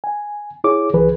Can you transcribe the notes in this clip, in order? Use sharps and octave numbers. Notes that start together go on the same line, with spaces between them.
G#5
E4 G#4 C#5 D6
C2 E3 G#4 B4